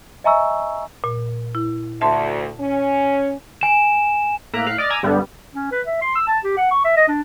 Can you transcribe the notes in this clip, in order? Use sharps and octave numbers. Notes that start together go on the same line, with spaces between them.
D#5 E5 G#5 A#5 C#6 E6
A#2
E4
D2 E5 A5 C6
C#4
G#5 E7
A2 A#3 E5 A#5 F#6 D7
A2 F5 F#6 B6
D5 D#5 D6 F6 A6
G#5 A#5 D6 E6 G#6 A#6
G2 D3 G3 B3
C#4
B4
E5
C6
E6
A5
G4
F#5
C#6
E5
D#5
D4